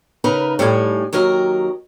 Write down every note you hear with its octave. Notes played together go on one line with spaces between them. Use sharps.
C#3 D#4 A#4 B4 A#5
A2 G3 D#4 A4 G#5
D#2 F#3 A#4 D#5